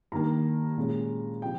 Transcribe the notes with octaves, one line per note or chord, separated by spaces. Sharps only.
G2 D#3 G3 A#3 A#5
A#2 G#3 C#4
C3 F3 G5